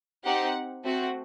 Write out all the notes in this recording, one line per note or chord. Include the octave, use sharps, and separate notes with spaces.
C4 D#4 G4 F#5
A3 C4 F#4